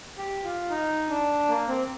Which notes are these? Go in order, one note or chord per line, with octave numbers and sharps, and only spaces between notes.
G4
F4
D#4
D4
A#3
C4